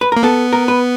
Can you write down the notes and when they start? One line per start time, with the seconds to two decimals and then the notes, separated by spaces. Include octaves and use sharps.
0.01 B4
0.12 A#3 A#4
0.23 B3 A4
0.53 A#4
0.68 B4